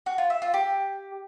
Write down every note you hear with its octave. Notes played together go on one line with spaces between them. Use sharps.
F#4
F4
E5
F4
G4